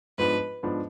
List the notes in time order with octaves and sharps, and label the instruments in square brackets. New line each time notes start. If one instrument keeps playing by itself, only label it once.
[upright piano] G#2 F3 B3 D4 [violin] B4
[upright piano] G#2 F3 B3 D4